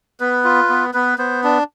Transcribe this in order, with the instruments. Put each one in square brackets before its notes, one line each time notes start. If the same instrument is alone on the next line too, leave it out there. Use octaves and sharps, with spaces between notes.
[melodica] B3 B4
F4
B3
B3 B4
B3 C5
D4